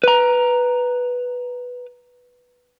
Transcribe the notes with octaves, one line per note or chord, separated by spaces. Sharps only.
B4 A#5